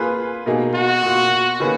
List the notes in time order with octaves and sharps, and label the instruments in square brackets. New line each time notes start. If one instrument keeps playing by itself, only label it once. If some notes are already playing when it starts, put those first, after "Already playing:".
Already playing: [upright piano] A#3 F4 G#4 B4
B2 A#3 D#4 G#4
[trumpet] F#4
[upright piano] B2 A#3 F4
D#3 A#3 C#4 G#4 B4